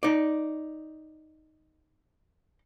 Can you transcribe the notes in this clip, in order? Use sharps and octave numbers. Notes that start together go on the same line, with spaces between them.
D#4 D5